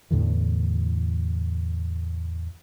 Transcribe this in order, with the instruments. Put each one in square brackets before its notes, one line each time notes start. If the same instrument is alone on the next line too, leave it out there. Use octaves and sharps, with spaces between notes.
[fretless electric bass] E2 A2 D3 E3